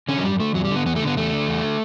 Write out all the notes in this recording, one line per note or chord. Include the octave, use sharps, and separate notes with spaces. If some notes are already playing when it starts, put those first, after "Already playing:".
D3 C#4
F#3
F#2 G3
D3 A3
E2 F#3
G3
D3
B3
E2 B3
A3
D3
B3
E2 A3
D3
E2
D3